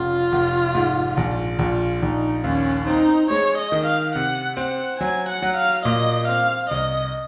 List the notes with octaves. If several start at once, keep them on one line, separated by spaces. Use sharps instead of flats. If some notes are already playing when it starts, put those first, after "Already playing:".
Already playing: F1 C#3 F4
F1
G#2
A#1
A#1 F4
A#1 D#4
D#2 C#4
C4 D#4
G#3 C#5
D#5
D#3
F5
C3 F#5
C4 F#5
F#3 G#5
F#5
F#3
F5
A#2 D#5
C4 F5
C2 D#5